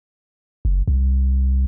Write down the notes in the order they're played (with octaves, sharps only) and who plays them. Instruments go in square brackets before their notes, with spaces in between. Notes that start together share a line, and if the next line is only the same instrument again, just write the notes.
[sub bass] F#1
C2